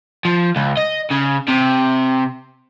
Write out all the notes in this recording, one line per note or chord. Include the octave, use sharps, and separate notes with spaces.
F3
C#2
D#5
C#3
C3